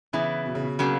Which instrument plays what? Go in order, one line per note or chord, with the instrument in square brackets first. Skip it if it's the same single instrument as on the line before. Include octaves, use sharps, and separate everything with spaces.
[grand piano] C#3 [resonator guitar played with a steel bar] E3 B3 E4
[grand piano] B2
C#3
B2
[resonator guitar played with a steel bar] C#3 F#3 A#3